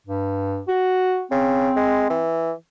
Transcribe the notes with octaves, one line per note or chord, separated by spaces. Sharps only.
G2
F#4
C#3 C4
G#3
E3